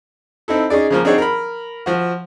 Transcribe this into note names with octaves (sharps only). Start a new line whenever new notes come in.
C4 D#4 E4 A4
C#4 D#4 G#4 D5
C#3 F3 A#3
C4 D4 D#4 G#4 C#5 F#5
A#4 B5
F3 F#4